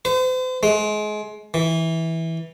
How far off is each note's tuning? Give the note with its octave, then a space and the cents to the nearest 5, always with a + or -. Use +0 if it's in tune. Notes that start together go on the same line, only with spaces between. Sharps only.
C5 -40
G#3 +30
E3 -15